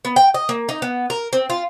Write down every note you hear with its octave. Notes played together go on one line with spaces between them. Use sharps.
B3
G5
D#5
A#3
D#4
B3
A#4
C4
F4